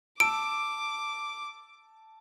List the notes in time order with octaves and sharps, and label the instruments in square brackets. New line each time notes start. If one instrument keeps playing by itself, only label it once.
[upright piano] A5 E6 [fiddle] D6 [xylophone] D7